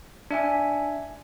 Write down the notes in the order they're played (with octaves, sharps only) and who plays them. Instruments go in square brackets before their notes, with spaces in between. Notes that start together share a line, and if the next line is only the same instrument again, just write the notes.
[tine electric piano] D4 E5 G#5